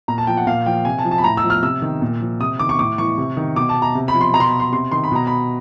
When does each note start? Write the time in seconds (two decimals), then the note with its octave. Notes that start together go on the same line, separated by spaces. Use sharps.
0.08 A#2 A#5
0.18 A5
0.27 F3 G5
0.37 F#5
0.47 A#2 F5
0.66 F3 G5
0.85 C3 G#5
0.99 A5
1.05 F3
1.11 A5
1.18 B5
1.24 A2 A#5
1.37 E6
1.44 F3
1.50 F6
1.63 C3 E6
1.82 D#3
2.02 A#2
2.21 F3
2.40 C3 D#6
2.59 D#3 D6
2.69 C#6
2.79 A2 D6
2.98 E3 C#6
3.18 C3
3.37 D#3
3.56 B2 D6
3.69 A5
3.82 A#5
3.95 C3
4.08 B5
4.14 F3
4.21 C6
4.33 B2 A#5
4.40 C6
4.46 B5
4.60 C6
4.72 C3 C6
4.92 D#3 C6
5.04 B5
5.12 B2 A#5
5.27 B5